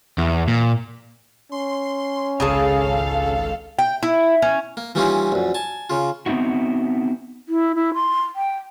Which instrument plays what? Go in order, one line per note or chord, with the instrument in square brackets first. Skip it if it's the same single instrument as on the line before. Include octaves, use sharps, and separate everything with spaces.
[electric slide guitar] E2
A#2
[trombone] C#4 [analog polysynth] C6
[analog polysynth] G#1 C#2 A4 [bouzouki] C#3 G#4 A5 [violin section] F5
[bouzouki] G5
E4
C#4
[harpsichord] A#3
E3 G3 A#3 C#4 D#4 F4
A#1 F#2
G#5 A5
C#3 F4
[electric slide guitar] B3 C4 D#4 E4 F#4
[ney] E4
E4
C6
G5